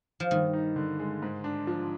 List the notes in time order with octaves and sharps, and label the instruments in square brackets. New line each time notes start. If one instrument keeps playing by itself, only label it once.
[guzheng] F3
[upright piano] G2 [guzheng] D#3
[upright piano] D#4
D3
G#3
G#2
D4
F3